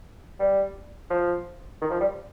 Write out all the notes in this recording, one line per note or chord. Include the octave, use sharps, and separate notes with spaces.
G3
F3
D#3
F3
G3